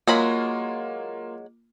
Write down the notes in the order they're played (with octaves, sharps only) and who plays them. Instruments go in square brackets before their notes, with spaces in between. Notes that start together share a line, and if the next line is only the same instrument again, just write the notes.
[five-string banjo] F#3 G#3 B5 [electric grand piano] A#3 F4